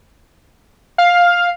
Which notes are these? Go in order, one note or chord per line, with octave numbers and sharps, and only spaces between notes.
F5